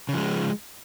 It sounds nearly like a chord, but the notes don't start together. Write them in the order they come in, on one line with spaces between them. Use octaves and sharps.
C#3 F3 G#3